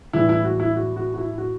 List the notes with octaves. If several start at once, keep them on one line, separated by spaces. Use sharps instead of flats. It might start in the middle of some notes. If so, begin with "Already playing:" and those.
A2 E3 G3 E4
E4
F#4
E4
F#4
F#4
F#4
E4
F#4